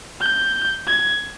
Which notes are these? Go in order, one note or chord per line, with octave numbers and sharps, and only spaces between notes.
G6
G#6